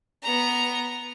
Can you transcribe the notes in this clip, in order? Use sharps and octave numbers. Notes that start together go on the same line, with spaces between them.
B3 A#5